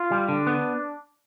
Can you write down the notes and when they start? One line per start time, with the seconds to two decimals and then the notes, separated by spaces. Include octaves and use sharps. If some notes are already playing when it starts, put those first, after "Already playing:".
Already playing: F4
0.11 G3
0.29 D3 D4
0.47 B3